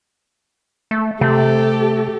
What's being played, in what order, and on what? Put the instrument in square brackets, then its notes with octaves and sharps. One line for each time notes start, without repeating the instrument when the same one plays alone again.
[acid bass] A3
[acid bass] C3 [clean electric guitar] A3 [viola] G4 A4